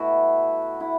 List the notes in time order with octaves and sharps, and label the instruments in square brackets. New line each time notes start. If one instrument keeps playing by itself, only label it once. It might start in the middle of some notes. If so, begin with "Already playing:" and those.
Already playing: [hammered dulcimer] B2 A3 E4 F#4
E4